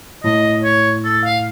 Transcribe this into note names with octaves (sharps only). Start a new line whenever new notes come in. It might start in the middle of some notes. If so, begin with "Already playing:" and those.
A2 D#5
C#5
A4
F5